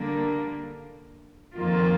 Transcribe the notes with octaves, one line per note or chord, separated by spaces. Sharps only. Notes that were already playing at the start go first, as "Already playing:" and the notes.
Already playing: D3 G3 A#3 D4
F2 D#3 A#3 F4